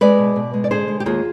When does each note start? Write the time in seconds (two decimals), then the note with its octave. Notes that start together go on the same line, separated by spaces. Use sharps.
0.01 G#3 B4 D5
0.19 B2
0.36 B2
0.54 G#3
0.64 D5
0.71 D3 G#4 C5
0.88 G#3
1.00 G4
1.06 D#2 F4 G#4